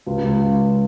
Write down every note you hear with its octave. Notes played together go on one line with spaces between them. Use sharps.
C#2
C#2